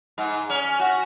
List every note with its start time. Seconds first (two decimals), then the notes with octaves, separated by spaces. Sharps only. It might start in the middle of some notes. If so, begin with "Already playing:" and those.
0.18 G#2
0.49 C#4
0.79 F#4